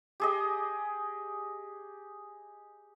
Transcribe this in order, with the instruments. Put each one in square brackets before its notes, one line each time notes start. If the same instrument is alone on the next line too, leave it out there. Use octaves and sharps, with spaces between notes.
[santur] G4 G#4 D#5